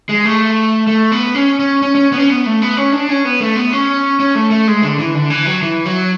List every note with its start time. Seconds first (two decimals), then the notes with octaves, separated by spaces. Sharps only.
0.09 G#3
0.25 A3
0.87 A3
1.12 B3
1.35 C#4
1.59 C#4
1.82 C#4
1.95 C#4
2.12 B3
2.18 C#4
2.30 B3
2.46 A3
2.62 B3
2.77 C#4
2.93 D4
3.09 C#4
3.25 B3
3.40 A3
3.56 B3
3.73 C#4
4.20 C#4
4.35 A3
4.51 A3
4.67 G#3
4.82 D3
4.99 E3
5.15 D3
5.30 E3
5.46 F#3
5.62 E3
5.86 F#3